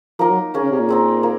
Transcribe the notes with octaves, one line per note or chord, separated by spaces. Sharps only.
F3 A#3 D#4 A#4
F#3
A#3 C#4 G#4
C#3
C3
A#2
G#3 C4 D#4
A#3